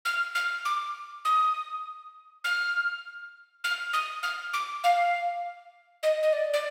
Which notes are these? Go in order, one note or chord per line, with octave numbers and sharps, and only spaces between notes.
F6
F6
D6
D#6
F6
F6
D#6
F6
D6
F5
D#5
D#5
D5
D5